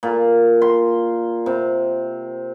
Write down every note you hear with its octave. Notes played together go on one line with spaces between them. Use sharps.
A#2
C6
C3